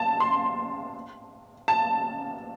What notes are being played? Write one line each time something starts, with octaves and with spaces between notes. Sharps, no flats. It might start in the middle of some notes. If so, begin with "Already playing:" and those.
Already playing: A5
C6
A5